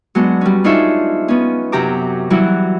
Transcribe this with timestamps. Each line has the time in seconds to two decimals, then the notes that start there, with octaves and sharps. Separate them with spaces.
0.15 F#3 G#3 B3 D4
0.41 G3 C#4
0.64 D4 D#4 F4 G#4 C#5 E5
1.28 B3 C#4
1.72 F#2 C3 F#3 G4 A#5 D6
2.30 E3 F#3 G3 E4 F#4